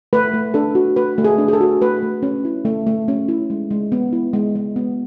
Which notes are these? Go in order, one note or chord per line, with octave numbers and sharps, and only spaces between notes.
A3 B4
A3
D4 A4
F#4
A3 B4
A3
G#4
D4
G#4
A4
F#4
A3 B4
A3
C#4
E4
A3
A3
C#4
E4
G#3
G#3
B3
E4
G#3
G#3
B3